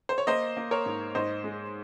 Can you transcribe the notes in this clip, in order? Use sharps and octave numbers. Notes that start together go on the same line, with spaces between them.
C5
C#5
A#3 C5 D#5
A#3
A#4 C#5
G#2
G#2 C5 D#5
G#3